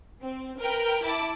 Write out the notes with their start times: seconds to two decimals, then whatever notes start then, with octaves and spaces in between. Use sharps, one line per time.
0.21 C4
0.59 A#4 B4 G5
1.03 E4 A5 D6